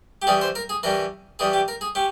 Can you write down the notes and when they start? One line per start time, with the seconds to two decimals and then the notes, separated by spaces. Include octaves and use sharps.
0.22 G4
0.27 E3 G3 C#4 G#4
0.41 C5
0.55 A#4
0.69 G#4
0.83 E3 G3 C#4 A#4
1.39 E3 G3 C#4 G#4
1.53 G4
1.68 A#4
1.81 G#4
1.95 C#4 G4